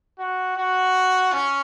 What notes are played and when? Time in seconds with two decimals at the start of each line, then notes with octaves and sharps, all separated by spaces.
0.19 F#4
0.57 F#4
1.33 C#4